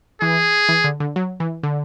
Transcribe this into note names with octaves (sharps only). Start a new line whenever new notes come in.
E3 G#4
E3
D3
D3
F#3
E3
D3